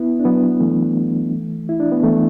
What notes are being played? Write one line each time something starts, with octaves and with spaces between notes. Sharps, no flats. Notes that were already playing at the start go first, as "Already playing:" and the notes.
Already playing: B3 E4
D4
F#3 B3
E3 A3
E4
D4
B3
E3 A3